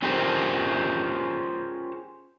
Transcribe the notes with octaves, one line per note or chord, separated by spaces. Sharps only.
C#4 F4 G4 G#4 A#4 C5